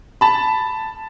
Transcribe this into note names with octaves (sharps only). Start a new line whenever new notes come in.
A5 B5